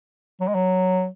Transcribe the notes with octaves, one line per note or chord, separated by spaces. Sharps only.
F#3
G#3
F#3